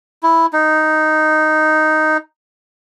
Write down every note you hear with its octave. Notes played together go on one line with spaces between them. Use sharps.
E4
D#4